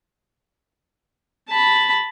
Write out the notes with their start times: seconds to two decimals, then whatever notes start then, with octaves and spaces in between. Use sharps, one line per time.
1.49 A5 B5